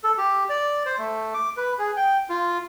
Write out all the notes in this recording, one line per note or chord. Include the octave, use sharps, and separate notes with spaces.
A4
G4
D5
C5
A3
D6
B4
G#4
G5
F4